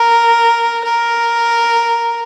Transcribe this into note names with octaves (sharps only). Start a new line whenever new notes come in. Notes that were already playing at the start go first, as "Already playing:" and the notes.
Already playing: A#4
A#4